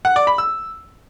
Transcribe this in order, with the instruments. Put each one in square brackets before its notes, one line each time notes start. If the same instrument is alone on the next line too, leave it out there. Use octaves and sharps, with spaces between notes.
[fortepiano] F#5
D5
B5
E6